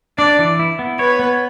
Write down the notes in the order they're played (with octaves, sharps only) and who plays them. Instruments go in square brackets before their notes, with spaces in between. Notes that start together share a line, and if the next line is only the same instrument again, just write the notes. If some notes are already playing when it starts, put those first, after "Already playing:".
[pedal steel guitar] D4 [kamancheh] D5
[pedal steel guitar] E3
E4
B3
[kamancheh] B4 [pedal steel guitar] C#5
[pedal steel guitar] B3